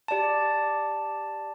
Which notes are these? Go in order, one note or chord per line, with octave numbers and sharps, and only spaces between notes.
G4 D5 A5